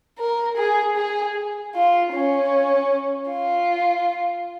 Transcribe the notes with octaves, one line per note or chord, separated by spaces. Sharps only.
A#4
G#4
G#4
F4
C#4
F4